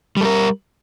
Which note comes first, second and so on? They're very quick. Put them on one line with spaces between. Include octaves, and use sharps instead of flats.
G3 A4 A#4